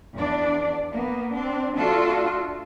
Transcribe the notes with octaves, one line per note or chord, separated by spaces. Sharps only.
E2 D4 D5
A#3 B3
C4 D4
A3 D4 F4 F#4 A4